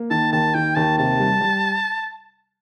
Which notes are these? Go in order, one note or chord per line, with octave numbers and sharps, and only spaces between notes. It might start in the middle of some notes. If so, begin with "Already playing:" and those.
Already playing: A#3
D#3 A5
D#2 A5
D#3 G5
D#2 A5
C3 A5
G3
G3